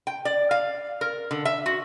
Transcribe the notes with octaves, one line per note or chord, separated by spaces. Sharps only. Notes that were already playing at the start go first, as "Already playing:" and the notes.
G5
D5
F5
A#4
D3
E5
F#4